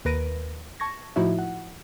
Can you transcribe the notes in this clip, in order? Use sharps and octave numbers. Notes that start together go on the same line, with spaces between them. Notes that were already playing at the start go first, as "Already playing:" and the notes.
D#2 A#4 B4 A#6 D7 D#7
A5 C#6 G#6 A#6
A2 F3 D#4 E4 F#4 E5
F#5